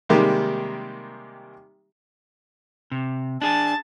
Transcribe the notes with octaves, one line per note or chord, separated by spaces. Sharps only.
C3 D#3 G3 G#3 A#3 G4
C3
D4 G#4 A5